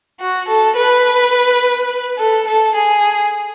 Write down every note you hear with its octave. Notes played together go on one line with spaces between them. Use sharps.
F#4
A4
B4
A4
A4
G#4